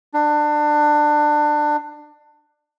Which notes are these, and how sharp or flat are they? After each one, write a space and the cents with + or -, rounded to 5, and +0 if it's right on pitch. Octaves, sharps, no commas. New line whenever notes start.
D4 +25